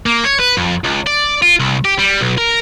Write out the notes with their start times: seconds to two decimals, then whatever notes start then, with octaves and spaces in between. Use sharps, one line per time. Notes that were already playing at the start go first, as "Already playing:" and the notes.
0.06 A#3
0.25 C#5
0.40 B4
0.57 F2
0.84 C#2
1.06 D5
1.42 F4
1.60 C2
1.85 G4
1.99 G3
2.21 B1
2.38 A#4